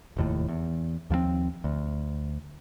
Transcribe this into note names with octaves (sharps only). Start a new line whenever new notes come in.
F1 D#2 A2
E2
D#2 F3 F#3 C4
D2